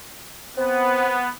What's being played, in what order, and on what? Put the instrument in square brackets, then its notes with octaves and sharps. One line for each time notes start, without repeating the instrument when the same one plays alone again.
[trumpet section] B3 [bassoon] C4